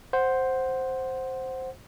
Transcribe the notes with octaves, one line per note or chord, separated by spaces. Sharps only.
C5 F#5